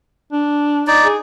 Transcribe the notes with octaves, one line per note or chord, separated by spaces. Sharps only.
D4
D#4 D5
G#4